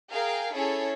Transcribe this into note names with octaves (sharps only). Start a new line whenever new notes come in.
G#4 A#4 F5 G5
C#4 E4 G#4 A4 C#5